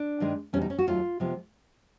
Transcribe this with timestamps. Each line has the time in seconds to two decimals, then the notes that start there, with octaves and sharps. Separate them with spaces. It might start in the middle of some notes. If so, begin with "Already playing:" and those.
Already playing: D4
0.20 G2 D#3 G#3
0.53 E2 B2 G3 C#4
0.62 D#4
0.70 C#4
0.79 F#4
0.87 D#2 D#3 F#3 A3 F4
1.20 C3 F3 G#3 B3